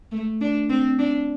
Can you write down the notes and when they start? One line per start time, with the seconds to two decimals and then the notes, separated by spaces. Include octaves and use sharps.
0.12 A3
0.41 D4
0.70 C4
0.99 D4